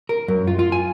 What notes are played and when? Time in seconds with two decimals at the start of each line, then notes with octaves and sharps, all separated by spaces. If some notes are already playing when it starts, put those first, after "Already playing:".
0.09 A#4
0.28 F#2
0.47 F4
0.59 F4
0.72 G#5